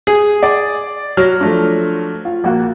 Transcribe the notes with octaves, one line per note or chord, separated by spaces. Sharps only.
G#4
D5
F#3 F6 A#6
F3 A3 D4
F4
A#1 A#3 F#4